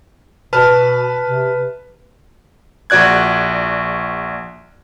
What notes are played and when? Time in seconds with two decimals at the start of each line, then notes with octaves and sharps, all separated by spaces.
0.53 B2 B4 A5 F6
1.24 C3
2.90 A#1 F#4 D5 F#6 G#6